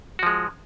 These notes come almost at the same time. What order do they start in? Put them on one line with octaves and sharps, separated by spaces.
F#4 F3 G#3